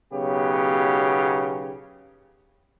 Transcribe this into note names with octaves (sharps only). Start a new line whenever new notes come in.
B1 C#3 F#3 B3 G4